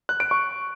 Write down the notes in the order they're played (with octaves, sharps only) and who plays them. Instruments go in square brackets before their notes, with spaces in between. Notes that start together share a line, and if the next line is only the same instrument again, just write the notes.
[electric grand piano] F#6
D7
C#6